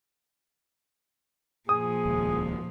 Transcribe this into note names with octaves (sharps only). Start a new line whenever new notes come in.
A#2 F3 G#4 D#6
D#1 C#2